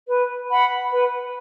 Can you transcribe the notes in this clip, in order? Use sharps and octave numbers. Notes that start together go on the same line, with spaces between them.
B4
F#5 B5
B4